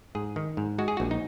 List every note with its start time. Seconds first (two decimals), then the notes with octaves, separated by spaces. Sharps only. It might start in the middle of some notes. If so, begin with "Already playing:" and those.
0.15 G#2 G#4
0.36 D#3
0.57 G#2
0.78 G#3 F#4
0.88 G#4
0.97 A#1 F#4
1.11 D#4